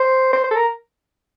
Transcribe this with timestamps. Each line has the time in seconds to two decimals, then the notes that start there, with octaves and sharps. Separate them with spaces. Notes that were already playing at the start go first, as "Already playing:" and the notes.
Already playing: C5
0.33 C5
0.44 C5
0.51 A4
0.56 A#4